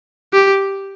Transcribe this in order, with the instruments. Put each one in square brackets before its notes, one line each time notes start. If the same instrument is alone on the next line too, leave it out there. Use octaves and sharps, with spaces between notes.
[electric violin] G4